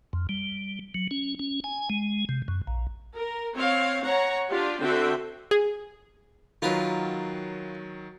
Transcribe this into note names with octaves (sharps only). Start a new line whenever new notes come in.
F2
G3
F#3
C#4
C#4
G#5
G#3
C3
F#2
A#1
A#4
C4 C#5 F5
C#5 F#5 A#5
D4 F4 G4
D3 C4 F#4 A4 E5 G5
G#4
D#3 F#3 F4 A#4 B4